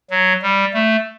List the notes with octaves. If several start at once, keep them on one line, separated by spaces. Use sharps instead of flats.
F#3
G3
A3